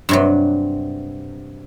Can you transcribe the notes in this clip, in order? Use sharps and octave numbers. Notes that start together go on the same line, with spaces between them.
G2 C3 F#3